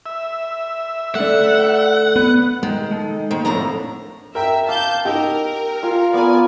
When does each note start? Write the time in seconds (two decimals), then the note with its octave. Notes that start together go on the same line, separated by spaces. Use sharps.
0.06 E5
1.15 A3 D4 F#5
2.16 B3
2.63 D#3 G#3
2.91 G#3 D#4 A4
3.31 D#3 A#3 C5
3.45 F2 A2 F3 D4 A#4 A#5
4.35 A#4 E5 G5
4.69 F5 A5 D6 G6
5.05 D#4 G4 A#4 E6
5.83 F4 F5 G#5
6.14 B3 A#4 D5 G#5